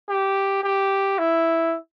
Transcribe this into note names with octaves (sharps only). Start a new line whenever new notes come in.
G4
G4
E4